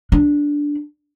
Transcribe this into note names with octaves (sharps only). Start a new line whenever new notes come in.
D4